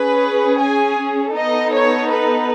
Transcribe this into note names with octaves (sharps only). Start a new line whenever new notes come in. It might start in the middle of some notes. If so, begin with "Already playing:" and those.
Already playing: C#4 G#4 B4
G#5
B3 D#4 A4 D#5
C#5
B4